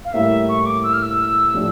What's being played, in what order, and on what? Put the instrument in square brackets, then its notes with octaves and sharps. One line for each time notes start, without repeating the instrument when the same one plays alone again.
[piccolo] F5
[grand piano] A2 G3 A#3 E4 G4 [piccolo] E5
[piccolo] C#6
D6
E6
F6
E6
[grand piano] A2 F3 A3 D4 G4